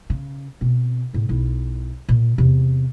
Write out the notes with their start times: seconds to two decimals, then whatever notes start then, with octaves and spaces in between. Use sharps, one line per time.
0.10 C#3
0.61 B2 C4
1.13 A2 C#3
1.29 B1 E4
2.09 A#2
2.38 E2 C3